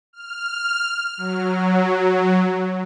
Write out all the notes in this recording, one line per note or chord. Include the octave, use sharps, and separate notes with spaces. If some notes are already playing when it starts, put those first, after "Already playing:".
F6
F#3